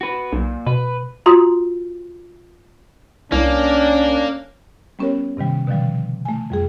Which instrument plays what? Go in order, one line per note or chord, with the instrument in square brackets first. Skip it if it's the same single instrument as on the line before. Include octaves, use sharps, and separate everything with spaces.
[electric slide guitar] F#4 B4
[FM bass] B1 [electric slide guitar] A#2
[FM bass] B2 [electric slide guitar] B4
[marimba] F4 F#4 A#5 C6 D#6
[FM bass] C2 [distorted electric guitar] A#3 [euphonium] C#4 [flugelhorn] D4
[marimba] G3 B3 C#4 G4 A#4 C#5
G2 C3 D#3 G3
B2 D3 D#3 F3 G3
A3 G#5
F2 G3 G#4